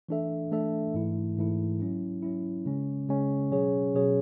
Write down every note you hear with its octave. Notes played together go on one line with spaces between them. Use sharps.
E3 A3 D4 A4 E5
E3 A3 D4 A4 E5
G#2 E3 A3 E4
G#2 E3 A3 E4
F#3 C#4 E4
F#3 C#4 E4
C#3 G#3 C#4
C#3 G#3 C#4
B2 F#3 C#4 G#4 C#5
B2 F#3 C#4 G#4 C#5